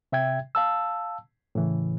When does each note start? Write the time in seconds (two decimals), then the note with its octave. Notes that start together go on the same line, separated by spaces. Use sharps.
0.12 C3 E5 G5 G#6
0.55 F5 A5 E6
1.55 A2 C#3 E3